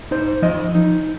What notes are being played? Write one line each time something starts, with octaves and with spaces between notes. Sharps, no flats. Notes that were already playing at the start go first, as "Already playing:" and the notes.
D#4 C5
F3 D#5
D#4